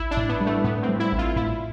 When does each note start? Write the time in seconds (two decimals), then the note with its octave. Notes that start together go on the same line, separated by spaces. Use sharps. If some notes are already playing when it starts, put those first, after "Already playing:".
Already playing: A1 E4
0.11 D4
0.17 A2
0.29 B3
0.41 G3
0.46 A3
0.64 A2 B3
0.83 C4
0.89 G3
1.00 E4
1.12 A1
1.18 F4
1.36 A2 E4